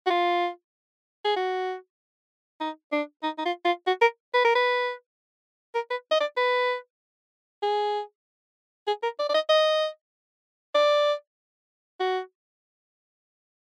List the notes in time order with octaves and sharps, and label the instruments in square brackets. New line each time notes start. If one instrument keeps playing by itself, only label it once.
[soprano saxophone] F#4
F4
G#4
F#4
D#4
D4
D#4
D#4
F4
F4
F#4
A#4
B4
A#4
B4
A#4
B4
D#5
D5
B4
G#4
G#4
A#4
D5
D5
D#5
D#5
D5
F#4